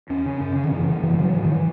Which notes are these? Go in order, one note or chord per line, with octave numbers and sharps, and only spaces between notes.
E2 C#4
C#3
F#2
C#3
D#3
F#2 E3
C#3
F#2 E3
G#3
C#3 F#3
G#2 E3
D#3
E3